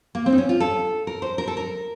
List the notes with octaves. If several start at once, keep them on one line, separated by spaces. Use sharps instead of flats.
A#3
C4
D#4
C#4
F4
A4
A#4
C5
A#4
A4
A#4